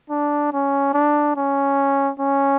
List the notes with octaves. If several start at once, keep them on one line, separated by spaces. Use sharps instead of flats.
D4
C#4
D4
C#4
C#4